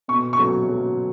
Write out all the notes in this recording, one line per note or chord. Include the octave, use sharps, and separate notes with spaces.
B2 C#6
C#6
F#3
F#3